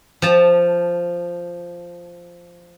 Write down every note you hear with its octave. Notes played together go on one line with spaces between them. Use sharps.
F3 A5